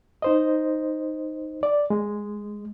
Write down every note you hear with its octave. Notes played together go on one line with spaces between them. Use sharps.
D#4 C5 D#5
D5
G#3